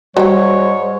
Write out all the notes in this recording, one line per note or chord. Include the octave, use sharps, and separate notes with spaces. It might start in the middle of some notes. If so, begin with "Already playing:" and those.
G#2 F#3 G3 G4 C#5